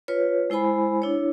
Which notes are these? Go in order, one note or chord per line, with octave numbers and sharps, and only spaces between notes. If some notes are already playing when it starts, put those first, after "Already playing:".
F4 B4 C#5
G#3 E4 C5 G#5 B5
D4 E4 C#5